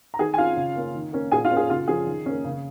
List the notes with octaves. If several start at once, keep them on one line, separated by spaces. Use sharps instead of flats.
A#5
D#3 G#4 G#5
G#5
C#4 F4 F5
C#3
A#3 C#4
D#3
A#3 C#4
A#2 G#4 G#5
F4 F5
A#3 C#4
G#4
C#3 F4
F3 C#4 G#4
D#3
A#3 C#4
C#3